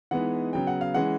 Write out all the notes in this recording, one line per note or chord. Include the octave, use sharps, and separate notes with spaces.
E3 G#3 B3 D#4 F#5
C#3 F#3 B3 G5
F#5
F5
E3 G#3 C#4 F#5